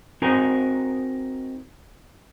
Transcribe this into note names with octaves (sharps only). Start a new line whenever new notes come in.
C4 D#4 F#4 A#4 G#5 A#5